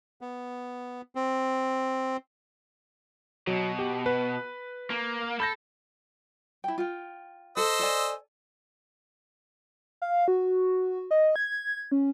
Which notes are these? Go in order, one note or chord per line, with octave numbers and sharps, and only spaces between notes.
B3
C4
B2 F#3
G4
B4
A#3
A4 B5 G6 A#6
E4 G5
F4 G5
A4 C5 D#5 E6
A4 D5 G#5
F5
F#4
D#5
G#6
C#4